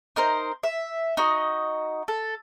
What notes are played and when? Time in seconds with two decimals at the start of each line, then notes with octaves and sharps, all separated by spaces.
0.16 D#4 A#4 C5
0.63 E5
1.17 D#4 F#4 D#5
2.08 A4